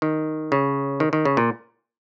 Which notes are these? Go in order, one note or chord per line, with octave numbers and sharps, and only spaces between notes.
D#3
C#3
D#3
D#3
C#3
A#2